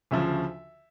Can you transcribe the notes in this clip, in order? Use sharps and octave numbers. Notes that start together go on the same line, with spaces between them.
D2 C#3 F3 E5